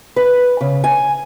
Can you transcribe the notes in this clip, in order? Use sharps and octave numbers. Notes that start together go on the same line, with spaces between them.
B4
C#3
G#5